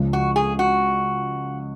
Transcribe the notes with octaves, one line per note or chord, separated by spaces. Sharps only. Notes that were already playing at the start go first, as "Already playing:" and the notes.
Already playing: C#2 C#3 F3 G#3
F#4
G#4
F#4